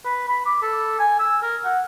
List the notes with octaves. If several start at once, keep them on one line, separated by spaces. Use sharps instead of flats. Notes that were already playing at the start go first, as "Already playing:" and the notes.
B4
B5
D6
A4
G#5
E6
A#4
F#5